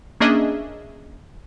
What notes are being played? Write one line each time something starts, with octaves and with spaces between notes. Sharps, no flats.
A#3 C#4 D4 G#4 D#5 E5